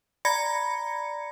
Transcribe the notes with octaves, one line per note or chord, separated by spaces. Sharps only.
D5 A#5 B5 G#6 A#6 C#7